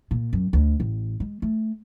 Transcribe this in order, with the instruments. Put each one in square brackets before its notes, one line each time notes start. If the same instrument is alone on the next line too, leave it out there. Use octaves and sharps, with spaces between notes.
[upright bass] A#2
F#2
D2
A1
G#3
A3